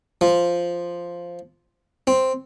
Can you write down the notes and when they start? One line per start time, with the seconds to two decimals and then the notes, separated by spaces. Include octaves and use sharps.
0.21 F3
2.07 C4